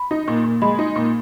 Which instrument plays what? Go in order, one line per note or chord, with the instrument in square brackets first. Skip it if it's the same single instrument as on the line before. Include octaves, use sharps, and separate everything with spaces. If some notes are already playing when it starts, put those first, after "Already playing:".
Already playing: [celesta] B5
[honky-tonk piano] D#4
A#2
A#2
[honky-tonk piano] G#3 [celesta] B5
[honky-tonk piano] D#4
A#2